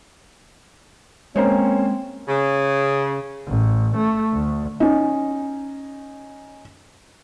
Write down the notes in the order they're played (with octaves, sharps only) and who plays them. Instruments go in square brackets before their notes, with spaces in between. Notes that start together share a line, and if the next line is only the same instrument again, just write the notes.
[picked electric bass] G#3 [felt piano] A#3 C5 C#5 [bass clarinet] C4 [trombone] C#4
[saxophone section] C#3
[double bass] A1
A3
D2
[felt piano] C#4 D#4